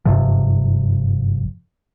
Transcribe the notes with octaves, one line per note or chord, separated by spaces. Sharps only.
F#1 G2 C3 F3